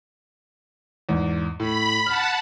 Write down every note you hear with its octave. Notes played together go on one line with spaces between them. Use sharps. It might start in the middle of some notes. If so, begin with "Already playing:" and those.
E2 G#2
A2 B5
F#5 A5 F6